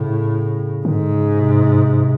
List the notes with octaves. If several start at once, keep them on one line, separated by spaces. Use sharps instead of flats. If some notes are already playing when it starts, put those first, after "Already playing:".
Already playing: A2 C#3
G#2 D3
C#3
C3